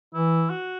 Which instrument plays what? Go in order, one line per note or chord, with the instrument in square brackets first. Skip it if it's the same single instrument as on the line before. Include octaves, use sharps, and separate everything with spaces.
[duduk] E3 [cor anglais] E4
[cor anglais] F#4